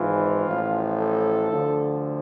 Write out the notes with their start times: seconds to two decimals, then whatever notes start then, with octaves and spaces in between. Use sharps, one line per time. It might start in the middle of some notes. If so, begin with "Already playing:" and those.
Already playing: G#1 G#2 E3 F4
0.45 A1 A2 F3
0.98 A4
1.51 D2 D3 F3